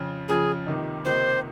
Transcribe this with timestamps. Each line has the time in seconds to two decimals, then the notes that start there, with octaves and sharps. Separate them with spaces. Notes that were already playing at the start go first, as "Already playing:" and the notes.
Already playing: F2 C#3 F3
0.28 F2 C#3 F3 G#4
0.66 C#2 C3 D#3 A#3 D#4
1.05 C#2 C3 D#3 A#3 D#4 C5